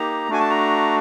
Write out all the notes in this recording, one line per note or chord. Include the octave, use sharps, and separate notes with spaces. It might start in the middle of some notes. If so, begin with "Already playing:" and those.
Already playing: A#3 D#4 G4 A#5
A3 D4 F#4 G#5
A5
A#5